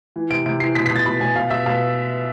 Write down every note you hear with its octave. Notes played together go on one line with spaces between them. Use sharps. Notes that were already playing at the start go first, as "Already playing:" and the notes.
E3
C3 D7
C3 D7
E3 C7
B2 B6
B6
B2 A6
B2 B5
B2 G#5
B2 F5
B2 E5
B2 F5